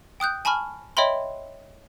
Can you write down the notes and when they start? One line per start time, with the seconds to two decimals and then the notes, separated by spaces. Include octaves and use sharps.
0.20 G5 D#6 F#6 G6
0.45 G#5 A5 B5 C#6 F6
0.97 C#5 D#5 E5 G5 B5 C6